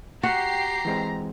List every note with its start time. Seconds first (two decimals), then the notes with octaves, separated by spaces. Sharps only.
0.23 F#4 G4 A#5 C7
0.85 E3 G#3 C4